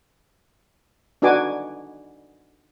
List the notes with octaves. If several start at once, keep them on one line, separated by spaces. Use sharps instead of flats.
D4 D#4 F#4 B4 G#5 D6